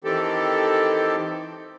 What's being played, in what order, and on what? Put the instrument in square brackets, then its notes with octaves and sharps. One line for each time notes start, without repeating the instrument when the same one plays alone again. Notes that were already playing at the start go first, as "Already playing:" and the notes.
[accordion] D#3 E3 C4 G4 A4